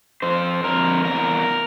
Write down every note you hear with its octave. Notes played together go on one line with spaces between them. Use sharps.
F2 C5
F2 A#4
E2 A#4